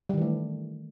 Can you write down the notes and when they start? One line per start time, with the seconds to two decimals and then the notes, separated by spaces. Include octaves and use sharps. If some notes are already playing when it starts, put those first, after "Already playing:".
0.09 G3
0.14 D#3
0.18 E3
0.22 A3